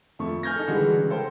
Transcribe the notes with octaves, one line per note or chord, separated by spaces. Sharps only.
F2 A3 C#6
G#5 F6 G6 G#6 A#6
D#4 A4
D3 E3 G3 G#3 F#4
C#3 G#3
A4 C5 G5